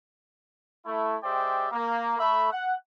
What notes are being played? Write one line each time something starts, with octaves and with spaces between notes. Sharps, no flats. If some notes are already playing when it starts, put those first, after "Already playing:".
A3 E4
G#3 G4 C5 D5 E5 G5
A#3
A3 E5 B5
F#5